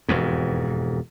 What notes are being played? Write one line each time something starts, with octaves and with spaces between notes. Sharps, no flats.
E1 F2 G#2